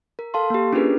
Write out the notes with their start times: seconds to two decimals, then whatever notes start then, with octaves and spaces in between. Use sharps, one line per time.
0.19 A#4
0.34 A4 F5 A5 C6
0.50 A#3 G4
0.73 C#4 D4 F4 G#4 A#4 B4